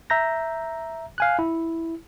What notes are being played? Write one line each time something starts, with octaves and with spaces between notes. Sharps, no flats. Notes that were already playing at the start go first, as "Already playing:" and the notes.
E5 A#5 G6 A#6
F5 G#5 F#6
E4